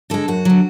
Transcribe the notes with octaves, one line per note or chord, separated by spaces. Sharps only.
D3 G#3 A4
F#2 F#4
D3 F#3